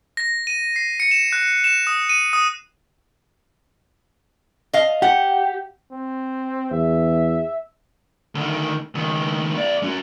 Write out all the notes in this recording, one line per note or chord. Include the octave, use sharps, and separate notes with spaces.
A#6
D#7
C7
C#7
E7
F#6
E7
D#6
D#7
D#6
D#5 F5
G4 F#5
C4
E2 E5
D2 D#3
C#2 D#3
B3 D5
C#4 F#4